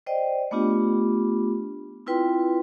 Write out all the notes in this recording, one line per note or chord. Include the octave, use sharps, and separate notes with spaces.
C5 D5 D#5 G5
A3 B3 D4 F4 G4
C4 E4 F4 B4 G5 C6